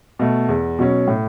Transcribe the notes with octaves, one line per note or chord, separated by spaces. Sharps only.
B2 A3
E2
B2 F#3 C#4
A2